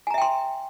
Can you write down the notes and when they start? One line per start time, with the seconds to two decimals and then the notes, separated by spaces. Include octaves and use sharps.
0.07 G#5
0.11 A#5
0.14 E5
0.18 G5
0.22 C6